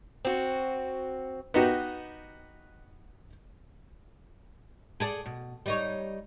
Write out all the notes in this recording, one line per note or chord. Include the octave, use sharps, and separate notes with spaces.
C4 F#4
B3 D#4 F#4 G4
G#4 A4 D5
B2
G3 D#4 C#5